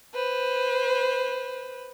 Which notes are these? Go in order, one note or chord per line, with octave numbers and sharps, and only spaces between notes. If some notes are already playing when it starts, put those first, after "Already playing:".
B4 C5